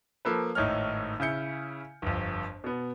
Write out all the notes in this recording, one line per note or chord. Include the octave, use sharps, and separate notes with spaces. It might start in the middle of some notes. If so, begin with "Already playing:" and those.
F3 A#3 A4 B4
G#1 A2 D#4 C#5 F6
C#3 E4 G6 C#7
G1 F2
B2 B3